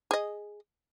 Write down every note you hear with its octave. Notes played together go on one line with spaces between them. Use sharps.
G#4 D#5